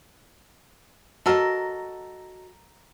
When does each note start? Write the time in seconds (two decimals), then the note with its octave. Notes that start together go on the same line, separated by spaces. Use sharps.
1.26 F#3 F#4 A4 A#4 D#5